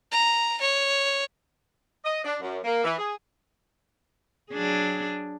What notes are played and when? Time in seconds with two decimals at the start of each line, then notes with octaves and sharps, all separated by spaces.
0.11 A#5
0.61 C#5
2.05 D#5
2.24 D4
2.41 F#2
2.64 A#3
2.84 E3
2.99 G#4
4.51 F#3 D4 G#4